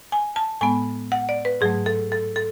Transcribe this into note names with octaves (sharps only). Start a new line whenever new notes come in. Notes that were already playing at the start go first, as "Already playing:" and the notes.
G#5
A5
A2 G#3 B3 G#5
F#5
D5
B4
G#2 F#3 A3 G#4
A4
A4
A4